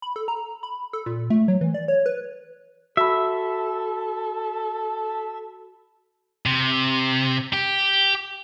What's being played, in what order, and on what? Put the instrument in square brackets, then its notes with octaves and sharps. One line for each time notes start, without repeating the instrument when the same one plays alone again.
[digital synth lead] B5
A4
A#5
B5
A4
A#2
A3
F#3
E3
D5
C#5
B4
[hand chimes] F#4 B5 [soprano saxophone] A4 [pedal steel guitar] E5
[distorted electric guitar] C3
G4